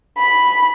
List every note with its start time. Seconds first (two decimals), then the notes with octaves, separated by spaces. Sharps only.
0.18 B5